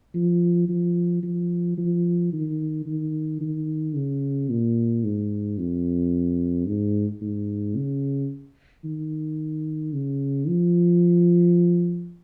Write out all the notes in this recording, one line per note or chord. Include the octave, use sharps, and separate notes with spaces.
F3
F3
F3
F3
D#3
D#3
D#3
C#3
A#2
G#2
F2
G#2
G#2
C#3
D#3
C#3
F3